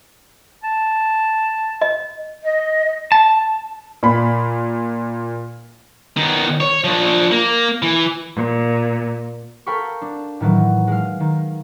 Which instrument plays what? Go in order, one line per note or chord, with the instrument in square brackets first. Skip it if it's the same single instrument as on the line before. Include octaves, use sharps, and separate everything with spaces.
[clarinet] A5
[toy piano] D#5
[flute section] D#5
[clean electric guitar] A5
[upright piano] A#2 B5
[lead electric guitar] D#3 B3
C#5
F3 D4
A#3
E3
[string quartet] A#2
[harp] A4 A#4 F5 G5 B5 C#6
D4
A2 D#3 E3 F#3
G#3 F5
D#3